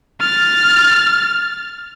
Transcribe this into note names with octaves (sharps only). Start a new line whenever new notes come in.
F6 A6